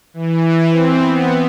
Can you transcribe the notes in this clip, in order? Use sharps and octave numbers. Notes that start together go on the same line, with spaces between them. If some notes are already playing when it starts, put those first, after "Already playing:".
E3
C4
B3